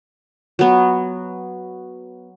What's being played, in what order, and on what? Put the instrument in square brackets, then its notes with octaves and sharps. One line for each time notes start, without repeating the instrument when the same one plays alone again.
[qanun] F#3 B3